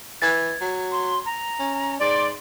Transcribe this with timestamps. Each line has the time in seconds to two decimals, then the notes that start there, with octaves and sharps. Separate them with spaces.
0.22 E3 G#6 A6
0.61 F#3
0.92 C6
1.26 A#5
1.59 C#4
2.00 G#2 D5 C6